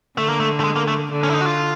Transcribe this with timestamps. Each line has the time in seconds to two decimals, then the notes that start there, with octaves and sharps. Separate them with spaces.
0.17 D3 A3
0.29 A#3
0.40 A3
0.60 A3
0.64 G#3
0.76 A#3
0.88 A3
1.11 D3
1.23 C#4
1.30 E4
1.35 D#4
1.41 F#4
1.46 F4